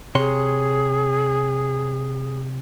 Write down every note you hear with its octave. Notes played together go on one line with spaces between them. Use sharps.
C3 G#4 C#5 C6